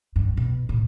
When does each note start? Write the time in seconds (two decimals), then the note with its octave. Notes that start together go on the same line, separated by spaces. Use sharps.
0.16 G2
0.37 B2
0.69 A2